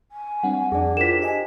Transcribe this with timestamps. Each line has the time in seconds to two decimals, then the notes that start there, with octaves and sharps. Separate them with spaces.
0.11 G#5
0.43 G3 C4 D4 F#5
0.72 F2 D4 G#4 D5
0.97 E4 F4 A#4 C5 G5 B6 E7
1.22 G4 D#5 G#5